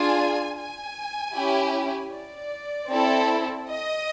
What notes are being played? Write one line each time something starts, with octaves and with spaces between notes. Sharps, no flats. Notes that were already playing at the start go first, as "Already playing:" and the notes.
Already playing: D4 F4 G#4 G#5
G#5
C#4 E4 G4
D5
C4 E4 A4
D#5